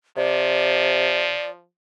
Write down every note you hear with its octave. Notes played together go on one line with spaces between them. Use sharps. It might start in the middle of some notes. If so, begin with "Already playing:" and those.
C3 F3 D5